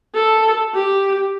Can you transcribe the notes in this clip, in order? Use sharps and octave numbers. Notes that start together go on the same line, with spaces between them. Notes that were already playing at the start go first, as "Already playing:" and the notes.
A4
G4